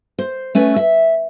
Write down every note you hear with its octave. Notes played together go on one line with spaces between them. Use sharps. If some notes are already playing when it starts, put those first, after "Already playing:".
C5
A3 C#4 B4
E5